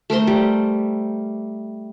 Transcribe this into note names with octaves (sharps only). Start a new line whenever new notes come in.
A3 A#4 C5 C6
G3